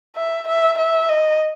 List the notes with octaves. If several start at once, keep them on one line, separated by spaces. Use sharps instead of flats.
E5
E5
E5
D#5